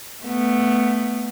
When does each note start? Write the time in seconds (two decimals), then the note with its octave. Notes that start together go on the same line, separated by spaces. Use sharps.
0.24 A3 B3